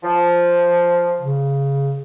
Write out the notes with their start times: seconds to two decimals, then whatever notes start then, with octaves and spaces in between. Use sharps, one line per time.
0.04 F3
1.21 C#3